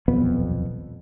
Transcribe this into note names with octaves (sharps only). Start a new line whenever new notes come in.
D#1 B1 F2 B3